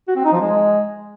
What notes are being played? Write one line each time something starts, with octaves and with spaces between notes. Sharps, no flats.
F#4
C4
D#4
F3
G#3